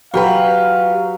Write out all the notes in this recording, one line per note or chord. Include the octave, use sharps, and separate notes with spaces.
F#3 F4 G4 B4 F5